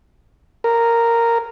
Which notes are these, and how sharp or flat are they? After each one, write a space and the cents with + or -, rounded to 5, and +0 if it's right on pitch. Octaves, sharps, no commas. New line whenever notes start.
A#4 -5